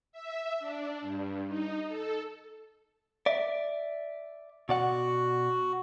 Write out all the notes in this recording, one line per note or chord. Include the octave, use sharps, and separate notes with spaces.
E5
D4
G2
D#4
A4
D5 E5
B2 F#4 D5 F#5